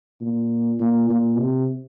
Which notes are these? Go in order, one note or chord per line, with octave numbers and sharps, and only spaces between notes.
A#2
A#2
A#2
C3